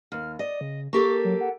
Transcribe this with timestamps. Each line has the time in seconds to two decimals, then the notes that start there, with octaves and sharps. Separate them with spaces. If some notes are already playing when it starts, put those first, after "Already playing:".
0.12 D#2 F6
0.39 D5 D#5
0.61 C#3
0.93 A#3 G4 A4 C#6
1.24 F#3
1.41 F#5